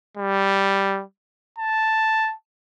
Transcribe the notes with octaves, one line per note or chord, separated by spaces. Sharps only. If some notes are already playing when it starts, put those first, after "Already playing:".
G3
A5